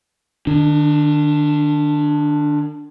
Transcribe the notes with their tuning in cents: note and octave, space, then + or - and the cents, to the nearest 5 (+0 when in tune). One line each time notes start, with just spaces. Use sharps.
D#3 -45 D4 +0